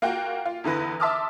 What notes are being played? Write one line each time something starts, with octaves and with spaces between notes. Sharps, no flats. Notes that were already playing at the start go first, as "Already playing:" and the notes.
A#3 F4 F#4 G5
F4
E2 D3 E3 B4 A#6
E5 A5 C6 D6 D#6 F6